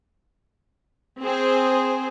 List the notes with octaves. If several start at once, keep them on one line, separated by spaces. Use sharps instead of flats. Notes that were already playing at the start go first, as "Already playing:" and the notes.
C4 G#4 C5